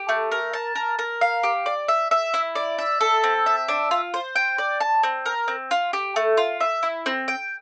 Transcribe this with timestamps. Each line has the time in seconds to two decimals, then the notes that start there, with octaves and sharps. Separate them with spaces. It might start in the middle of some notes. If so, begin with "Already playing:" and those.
Already playing: G4
0.09 A3
0.31 A#4
0.53 A5
0.75 A#4
0.99 A#4
1.21 F5
1.43 G4
1.66 D5
1.88 E5
2.11 E5
2.34 E4
2.55 D5
2.78 E5
3.01 A4
3.24 C4
3.46 E5
3.68 D4
3.91 F4
4.14 C5
4.35 G5
4.58 D5
4.80 A5
5.03 C4
5.26 A#4
5.48 C4
5.71 F4
5.93 G4
6.16 A3
6.37 F4
6.60 E5
6.83 E4
7.06 C4
7.28 G5